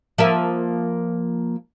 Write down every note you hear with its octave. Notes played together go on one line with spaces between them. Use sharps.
F3 A#3 E5